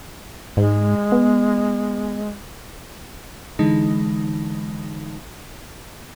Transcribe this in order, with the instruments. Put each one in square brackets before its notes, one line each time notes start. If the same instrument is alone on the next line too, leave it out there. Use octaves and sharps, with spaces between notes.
[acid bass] G#2 [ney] G#3
[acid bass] B3
[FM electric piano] D3 E3 G#3 D#4